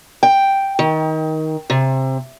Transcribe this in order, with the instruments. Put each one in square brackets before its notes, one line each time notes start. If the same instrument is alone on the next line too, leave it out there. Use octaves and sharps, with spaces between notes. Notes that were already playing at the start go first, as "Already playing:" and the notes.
[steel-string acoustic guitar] G5
D#3
C3